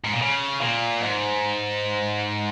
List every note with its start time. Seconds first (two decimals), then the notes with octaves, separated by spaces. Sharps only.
0.04 G#2
0.13 A#2
0.22 C#3
0.62 A#2
1.01 G#2